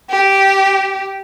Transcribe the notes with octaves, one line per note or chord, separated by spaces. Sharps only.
G4